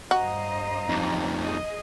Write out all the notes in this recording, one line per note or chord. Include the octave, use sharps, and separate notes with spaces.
G2 F#4 C5 D#5 F5 A#5
F2 D#3
G#4 D#5